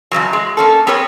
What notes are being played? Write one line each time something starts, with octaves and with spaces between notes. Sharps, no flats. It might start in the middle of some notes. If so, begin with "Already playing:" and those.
F2 C#3 E3 F#3
G#3
A#3 C#4 A4
B3 C4 G#4 A#4 C#5